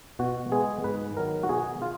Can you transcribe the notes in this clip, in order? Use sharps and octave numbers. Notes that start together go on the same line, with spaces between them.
B2 F#4
G#3 B3 G#4
G#2 B4
D#3 F#3 A#4
F#4
B2 G#4
F4